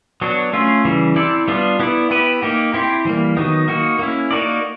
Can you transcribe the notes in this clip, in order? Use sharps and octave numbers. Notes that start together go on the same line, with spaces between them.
F#3 B3 D4 F#4
A3 C#4 F4
C#3 E3 G3
C4 E4 A4 D5
G3 B3 D4 F4
B3 E4 A4 D5
B3 E4 G4 B4
A#3 D#4 G4
C4 E4 G4
E3 G3 A#3
D#3 F#3 B3 D#4
A#3 D#4 F#4
A#3 C#4 E4
A#3 D#4 F#4 A#4 D5